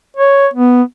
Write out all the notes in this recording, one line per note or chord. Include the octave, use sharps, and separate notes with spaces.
C#5
B3